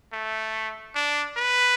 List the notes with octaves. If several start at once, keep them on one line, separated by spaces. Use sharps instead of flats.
A3
D4
B4